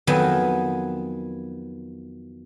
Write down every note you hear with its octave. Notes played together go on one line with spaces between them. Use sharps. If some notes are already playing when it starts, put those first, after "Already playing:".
F2 D#3 F#3 B3 G#5